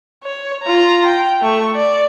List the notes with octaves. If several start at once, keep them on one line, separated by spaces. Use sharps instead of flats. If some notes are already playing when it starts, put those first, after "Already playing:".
C#5
F4 A#5
G5
A3 C#6
D5